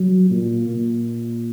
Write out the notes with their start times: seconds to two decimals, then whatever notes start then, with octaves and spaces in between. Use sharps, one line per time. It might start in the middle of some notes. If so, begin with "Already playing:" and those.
Already playing: F#3
0.30 A#2
0.68 A#2